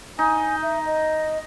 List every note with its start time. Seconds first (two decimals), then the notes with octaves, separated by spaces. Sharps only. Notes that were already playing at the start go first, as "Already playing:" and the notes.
0.19 D#4 G#5
0.63 E5
0.85 D#5